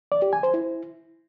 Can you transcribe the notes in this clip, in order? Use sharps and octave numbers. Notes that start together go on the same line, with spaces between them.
D5
G4
G#5
C5
E4